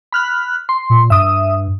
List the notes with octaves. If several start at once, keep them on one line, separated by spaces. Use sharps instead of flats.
B5 F6 F#6
C6
A#2
G2 E5 D#6